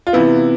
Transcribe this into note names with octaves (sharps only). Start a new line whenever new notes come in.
F4
C3 E3 B3 E4